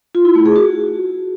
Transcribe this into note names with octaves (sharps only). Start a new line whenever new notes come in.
F4
E4
A3
G#4
F#4